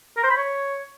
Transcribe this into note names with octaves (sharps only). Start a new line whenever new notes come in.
A#4
C5
B5
C#5